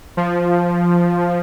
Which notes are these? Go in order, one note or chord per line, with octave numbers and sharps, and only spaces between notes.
F3